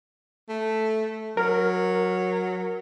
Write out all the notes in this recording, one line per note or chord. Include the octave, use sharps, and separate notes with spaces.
A3
F#3 A#4